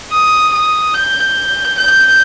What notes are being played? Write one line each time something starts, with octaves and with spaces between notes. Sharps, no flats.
D#6
D#6
G6
G6